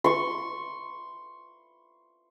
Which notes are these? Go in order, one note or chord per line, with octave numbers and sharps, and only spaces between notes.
C6 C#6